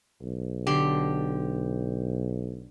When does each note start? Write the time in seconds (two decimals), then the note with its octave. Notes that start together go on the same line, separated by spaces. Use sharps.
0.22 B1
0.67 D3 G4 C6